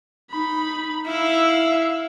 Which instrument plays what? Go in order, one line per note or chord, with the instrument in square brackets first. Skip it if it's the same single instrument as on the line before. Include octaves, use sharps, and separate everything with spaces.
[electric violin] D#4 B5
[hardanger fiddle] E4 [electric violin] F5 E6